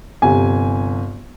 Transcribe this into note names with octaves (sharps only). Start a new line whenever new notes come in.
G1 C3 G#5